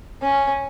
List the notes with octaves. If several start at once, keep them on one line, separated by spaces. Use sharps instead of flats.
C#4